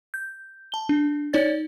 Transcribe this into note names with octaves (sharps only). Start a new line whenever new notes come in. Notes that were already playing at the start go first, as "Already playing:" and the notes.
G6
A5 G7
D4
D#4 C#5 D5 A6